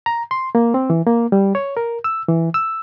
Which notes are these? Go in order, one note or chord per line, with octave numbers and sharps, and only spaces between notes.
A#5
C6
A#3
C4
E3
A#3
G3
C#5
A#4
E6
E3
E6